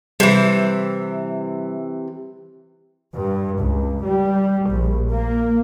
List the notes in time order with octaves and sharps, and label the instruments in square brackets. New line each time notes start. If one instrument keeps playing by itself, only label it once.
[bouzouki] C3 E3 [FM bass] G3
[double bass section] G2
C#2
G3
A#1
A#3